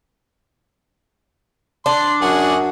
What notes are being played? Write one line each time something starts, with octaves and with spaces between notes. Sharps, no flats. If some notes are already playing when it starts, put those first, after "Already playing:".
D4 C6
F#2 F#4 G#4 F#5